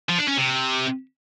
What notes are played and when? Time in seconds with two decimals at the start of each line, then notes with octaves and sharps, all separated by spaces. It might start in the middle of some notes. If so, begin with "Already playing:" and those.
0.09 F3
0.18 D4
0.28 C#4
0.37 C3